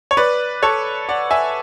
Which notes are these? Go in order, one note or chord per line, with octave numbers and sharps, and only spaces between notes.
C#5
B4 D5
A4 C#5
D5 F#5
E5 G#5